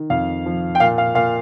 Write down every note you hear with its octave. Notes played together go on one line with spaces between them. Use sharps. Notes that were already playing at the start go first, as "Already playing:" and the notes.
Already playing: D#3
F2 F5
F3
G5
A#2 F5
F5
A#2 F5